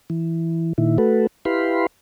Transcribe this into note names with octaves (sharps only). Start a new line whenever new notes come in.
E3
A#2 D#3 E4
A3 F#4 A4 B4
E4 G4 B4 F5 B5 C6